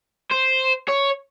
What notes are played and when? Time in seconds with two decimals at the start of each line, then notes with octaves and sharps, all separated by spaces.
0.31 C5
0.89 C#5